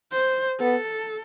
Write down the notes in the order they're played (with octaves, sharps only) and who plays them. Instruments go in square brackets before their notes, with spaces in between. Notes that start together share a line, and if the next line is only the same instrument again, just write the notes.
[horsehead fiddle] C5
[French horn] B3 [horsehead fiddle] A4